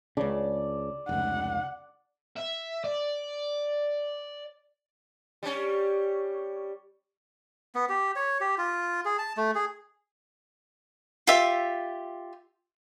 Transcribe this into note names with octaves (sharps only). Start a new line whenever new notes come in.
C#2 C#3 D5 A5
F1 C#2 F#5
E5
D5
G3 C#4
B3
G4
C#5
G4
F4
G#4
A5
A3
G#4
F4 G4 E5